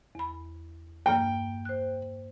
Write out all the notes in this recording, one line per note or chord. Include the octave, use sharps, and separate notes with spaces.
E2 B5
G2 A#3 G5 F6
C5 F#6